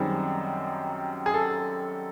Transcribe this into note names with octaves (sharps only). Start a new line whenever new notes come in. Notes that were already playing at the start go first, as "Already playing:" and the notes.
Already playing: F#2 D#3 G3 C4 G#4
G#4
A4